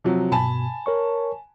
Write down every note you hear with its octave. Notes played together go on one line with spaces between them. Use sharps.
C3 F3 F#3
G2 B2 G#5 A5 B5
A#4 C#5 C#6